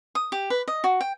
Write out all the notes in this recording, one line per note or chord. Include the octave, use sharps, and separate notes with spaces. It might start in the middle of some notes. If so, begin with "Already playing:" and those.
D#6
G4
B4
D#5
F#4
G5